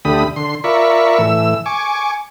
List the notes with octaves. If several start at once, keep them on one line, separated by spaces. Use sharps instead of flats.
D2 D3 A3 G4 B5 D#6
D3 C6
F4 A#4 D5 E5 B5 C#6
A2 E3 E6
G#5 C#6 D6